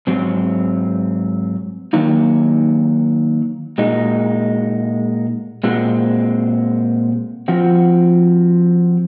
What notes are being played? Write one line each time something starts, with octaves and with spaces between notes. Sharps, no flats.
G#2 F#3 C4
D#3 F#3 A#3 D#4
A#2 G#3 D#4 F#4
A#2 G#3 C4 F#4
F3 C4 F#4